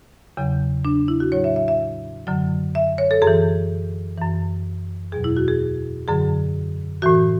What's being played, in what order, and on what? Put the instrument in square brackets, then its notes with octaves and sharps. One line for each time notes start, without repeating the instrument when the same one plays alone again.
[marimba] E2 C#3 F#3
D4
E4
F#4
A2 F#3 C#5
E5
E5
E5
F#2 D3 F#3
E5
C#5
A4
F#2 G#4
E3
F#2 E3
E2 B2 F#3 G#4
E4
F#4
G#4
F#2 D3 F#3 G#4
A2 E3 F#4